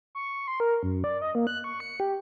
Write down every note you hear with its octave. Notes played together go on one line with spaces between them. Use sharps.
C#6
C6
A#4
F#2
D5
D#5
A#3
F#6
C#6
C#7
G4